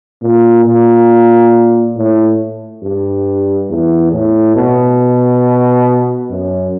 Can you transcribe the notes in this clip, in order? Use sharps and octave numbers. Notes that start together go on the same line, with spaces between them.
A#2
A#2
A2
G2
E2
A2
B2
F#2